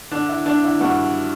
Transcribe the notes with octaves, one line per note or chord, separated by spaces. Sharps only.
D3 D4
E4
D3 D4
E4
G2 F#4